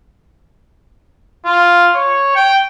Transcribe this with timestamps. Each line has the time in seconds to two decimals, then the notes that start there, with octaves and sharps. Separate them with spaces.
1.45 F4
1.95 C#5
2.36 G5